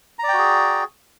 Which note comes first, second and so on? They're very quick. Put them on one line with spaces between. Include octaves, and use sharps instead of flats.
A#5 D5 G5 F#4 G#4